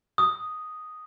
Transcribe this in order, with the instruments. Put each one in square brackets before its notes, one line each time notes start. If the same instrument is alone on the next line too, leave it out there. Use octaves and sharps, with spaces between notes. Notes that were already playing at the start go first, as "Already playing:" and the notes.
[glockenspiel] D#6